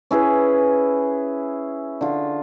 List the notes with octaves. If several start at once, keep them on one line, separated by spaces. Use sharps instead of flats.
C#4 E4 G#4 B4
D3 F4